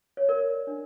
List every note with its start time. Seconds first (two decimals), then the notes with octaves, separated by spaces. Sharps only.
0.17 C#5
0.29 A#4 D5
0.67 D4